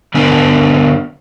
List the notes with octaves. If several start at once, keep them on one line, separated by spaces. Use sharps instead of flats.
D3 B3 D4 A#4 G#5